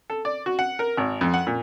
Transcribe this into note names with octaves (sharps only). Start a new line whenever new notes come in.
A4
D5
F#4
F#5
A#4
G#1
F2
F#5
A#2